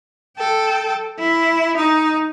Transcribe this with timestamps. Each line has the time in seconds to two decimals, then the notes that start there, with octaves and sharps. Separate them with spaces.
0.38 A4 G5
1.19 E4
1.76 D#4